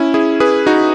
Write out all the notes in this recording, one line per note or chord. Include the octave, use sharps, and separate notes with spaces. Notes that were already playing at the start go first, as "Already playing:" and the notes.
Already playing: C#4 E4
E4 G#4
G#4 B4
D#4 F#4